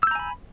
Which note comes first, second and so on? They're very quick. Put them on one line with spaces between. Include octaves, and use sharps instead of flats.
E6 G6 A#5 G#5 B5